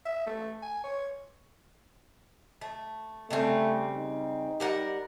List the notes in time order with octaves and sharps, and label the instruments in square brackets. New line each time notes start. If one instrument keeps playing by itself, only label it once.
[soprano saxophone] E5
A3
G#5
C#5
[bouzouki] A3
[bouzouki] C#3 G3 C4 [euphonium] A3
[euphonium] D#4
[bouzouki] G3 A#4 F#5